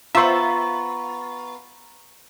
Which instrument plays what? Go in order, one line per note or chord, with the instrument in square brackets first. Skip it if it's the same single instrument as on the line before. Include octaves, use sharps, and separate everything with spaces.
[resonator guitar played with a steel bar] B3 F4 [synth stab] C5 E5 [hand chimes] A#5 C#6